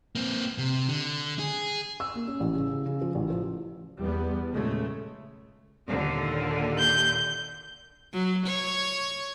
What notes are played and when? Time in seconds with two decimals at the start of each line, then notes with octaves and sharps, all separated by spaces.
0.15 A#3 C4
0.58 C3
0.89 D3
1.39 G#4
2.00 E6
2.15 A#3
2.27 C#4
2.40 A1
2.55 C#3
2.71 C#3
2.86 C#3
3.01 F3
3.15 A1
3.30 F3
3.99 E2 G3 B3
4.51 A#2 C#3 G#3 A3
5.88 D#2 A#2 D3
6.78 G6
8.14 F#3
8.46 C#5